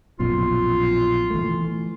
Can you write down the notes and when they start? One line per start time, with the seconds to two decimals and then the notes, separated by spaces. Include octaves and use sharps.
0.20 A#1 F#2 B2 F4
1.30 E3 A3